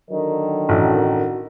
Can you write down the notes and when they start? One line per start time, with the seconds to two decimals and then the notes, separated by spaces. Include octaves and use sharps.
0.10 D3 D#3 F#3
0.69 A1 F#4